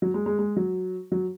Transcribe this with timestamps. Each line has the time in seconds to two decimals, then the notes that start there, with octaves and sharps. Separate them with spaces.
0.02 F#3
0.14 G#3
0.26 G#3
0.39 G#3
0.56 F#3
1.12 F#3